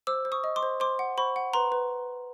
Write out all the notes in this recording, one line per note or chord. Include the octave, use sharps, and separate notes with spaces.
C5 D6 E6
C5
C#6 D#6
D#5
C6 D6
C5
C5 C6 D6
F#5
C5 B5 C#6
F#5
B4 A#5 C6
B4